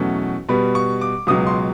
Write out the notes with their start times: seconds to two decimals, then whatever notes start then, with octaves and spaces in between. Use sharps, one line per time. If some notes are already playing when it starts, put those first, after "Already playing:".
Already playing: E2 B2 F#3 A3 C#4
0.49 B2 G3 B3 B5
0.75 C#6
1.01 D6
1.27 C#2 B2 F#3 D#6
1.47 C6